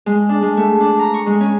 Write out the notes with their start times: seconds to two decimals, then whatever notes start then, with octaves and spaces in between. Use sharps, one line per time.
0.06 G#3
0.29 D4
0.42 G#3
0.57 A3
0.80 D4
0.99 A#5
1.14 C#6
1.26 G#3
1.41 C#4